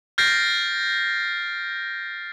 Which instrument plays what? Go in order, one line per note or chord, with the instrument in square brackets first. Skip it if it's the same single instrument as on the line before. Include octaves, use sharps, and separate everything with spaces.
[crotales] F6 G6 A6 A#6 C7 D7